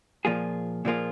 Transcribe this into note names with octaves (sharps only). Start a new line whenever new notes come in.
A#2 F3 A#3 F4 G#4
A#2 F3 A#3 F4 G#4